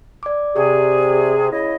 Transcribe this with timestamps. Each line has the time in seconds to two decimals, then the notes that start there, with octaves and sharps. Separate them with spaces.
0.23 D5 D6
0.56 C3 G4 G#4 D5
1.52 C#3 E4 D#5